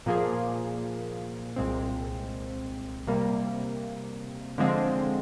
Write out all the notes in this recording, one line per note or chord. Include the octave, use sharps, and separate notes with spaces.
A#2 F3 A#3 F4 G#4
C2 A#2 G#3 C4
C3 G3 A#3
D3 F3 G#3 C4